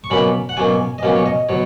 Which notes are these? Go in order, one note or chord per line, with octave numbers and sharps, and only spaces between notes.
C#6
B2 F#3 A#3 C#4 B5
F#5
B2 F#3 A#3 C#4 G#5
D#5
B2 F#3 A#3 C#4 F5
C#5
D#5
B2 F#3 C#5